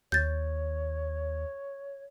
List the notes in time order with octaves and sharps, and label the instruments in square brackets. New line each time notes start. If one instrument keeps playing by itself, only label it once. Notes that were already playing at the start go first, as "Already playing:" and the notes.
[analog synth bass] D#2 [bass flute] C#5 [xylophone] G6 A6